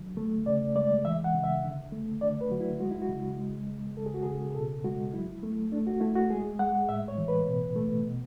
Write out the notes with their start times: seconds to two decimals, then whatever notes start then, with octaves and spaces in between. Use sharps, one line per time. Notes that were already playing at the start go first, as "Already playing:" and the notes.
Already playing: D3 F#3
0.17 A3
0.46 C#3 D5
0.76 G#3 D5
1.05 E3 E5
1.24 F#5
1.33 C#3
1.44 E5
1.64 D3
1.92 A3
2.21 D3 D5
2.41 B4
2.50 F#3 F#4
2.60 E4
2.80 G#3 F#4
2.91 E4
3.02 F#4
3.09 C#3
3.39 G#3
3.67 G#3
3.97 C#3 A4
4.06 G#4
4.14 F#4
4.23 C#3 G#4
4.50 G#4
4.55 B2 A4
4.84 G#3 F#4
5.13 F#3 E4
5.43 A3
5.72 A3 D4
5.87 F#4
6.01 A3 E4
6.15 F#4
6.30 G#3 G#4
6.59 G#3 F#5
6.89 A2 E5
7.08 C#5
7.18 E3
7.28 B4
7.47 B2
7.76 A3
8.06 B2